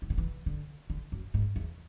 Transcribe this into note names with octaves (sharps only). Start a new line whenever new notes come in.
E3
D3
E3
D3
D3
F#2
G#2
E2